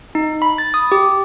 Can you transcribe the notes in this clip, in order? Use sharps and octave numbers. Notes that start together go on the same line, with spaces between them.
D#4
B5
A6
D#6
G4